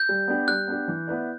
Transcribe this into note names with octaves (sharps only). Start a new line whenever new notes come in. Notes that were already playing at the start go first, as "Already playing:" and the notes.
Already playing: G6
G3
B3 D4 G4
G3 F#6
B3 D4 G4
E3
B3 E4 B4 D5